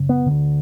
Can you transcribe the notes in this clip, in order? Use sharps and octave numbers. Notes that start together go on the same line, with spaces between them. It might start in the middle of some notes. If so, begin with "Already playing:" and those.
Already playing: F#2 C#3
B3
D2 D3